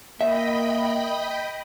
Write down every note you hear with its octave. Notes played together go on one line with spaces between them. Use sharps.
A#3 D#5 E5 G5 B5